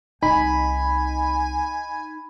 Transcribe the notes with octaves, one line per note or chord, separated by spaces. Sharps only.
C2 D#4 G#5 B5